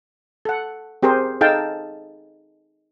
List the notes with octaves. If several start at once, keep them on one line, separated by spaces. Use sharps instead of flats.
A4 F#5
C4 G4 G#4 A#4 C5
D#4 G#4 A4 F5 G5 A5